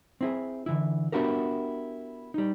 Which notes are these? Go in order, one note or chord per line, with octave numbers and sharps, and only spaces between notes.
C4 E4 G#4
D3 E3 E4
B3 D4 E4 F#4 G4 A#4
G3 D#4